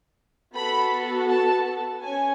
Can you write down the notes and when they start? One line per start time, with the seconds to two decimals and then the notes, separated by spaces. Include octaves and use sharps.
0.54 B3 F#4 A4 B5
1.29 A5
2.04 C#4 G#5